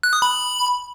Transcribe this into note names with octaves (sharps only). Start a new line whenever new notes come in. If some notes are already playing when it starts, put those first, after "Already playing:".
F#6
D#6
B5